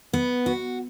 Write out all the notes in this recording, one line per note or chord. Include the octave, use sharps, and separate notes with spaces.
B3
F#4